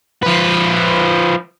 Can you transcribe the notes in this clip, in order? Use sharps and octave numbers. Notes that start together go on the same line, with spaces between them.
F3 B4